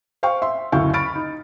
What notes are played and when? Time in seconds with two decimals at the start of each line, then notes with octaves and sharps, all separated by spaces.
0.23 C5 F5 G5 C#6
0.42 E5 C6
0.72 F#1 D2 E4 F5 C#6 G6
0.94 B5 C#6 F6 A6 D7
1.15 D#4